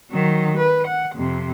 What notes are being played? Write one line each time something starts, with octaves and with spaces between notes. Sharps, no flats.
D#3 F#3
B4
F#5
F2 C3